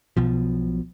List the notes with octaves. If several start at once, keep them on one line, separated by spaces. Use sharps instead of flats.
B1 B2 F3